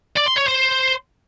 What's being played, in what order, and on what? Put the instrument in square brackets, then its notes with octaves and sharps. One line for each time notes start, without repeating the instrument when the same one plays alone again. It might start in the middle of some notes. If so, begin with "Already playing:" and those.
[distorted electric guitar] D5
C6
C#5
C5